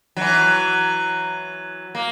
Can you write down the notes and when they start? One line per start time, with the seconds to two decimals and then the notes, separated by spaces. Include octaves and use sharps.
0.16 E3 F#3
1.95 A#3